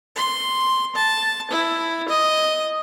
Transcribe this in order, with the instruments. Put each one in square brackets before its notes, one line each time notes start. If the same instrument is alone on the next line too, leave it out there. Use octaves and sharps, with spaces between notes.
[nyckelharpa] C6
A5
E4
D#5